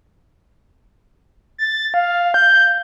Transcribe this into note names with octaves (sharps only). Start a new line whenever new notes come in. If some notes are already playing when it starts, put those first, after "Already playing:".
A6
F5
G6